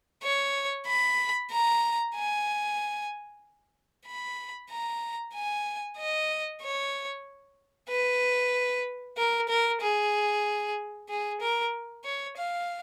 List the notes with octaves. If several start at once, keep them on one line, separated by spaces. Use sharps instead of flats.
C#5
B5
A#5
G#5
B5
A#5
G#5
D#5
C#5
B4
A#4
A#4
G#4
G#4
A#4
C#5
F5